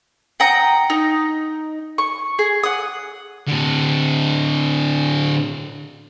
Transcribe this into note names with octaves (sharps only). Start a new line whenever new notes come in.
F#5 G5 A#5 D#6
D#4
C#6
G#4
F#5 D#6
A2 D3